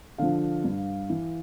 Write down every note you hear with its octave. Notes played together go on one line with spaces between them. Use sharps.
D3 F3 F5
G2
E3